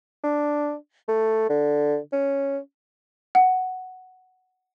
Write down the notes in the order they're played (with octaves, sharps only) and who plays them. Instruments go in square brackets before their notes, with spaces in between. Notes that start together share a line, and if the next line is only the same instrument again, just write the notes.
[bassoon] D4
A3
D3
C#4
[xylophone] F#5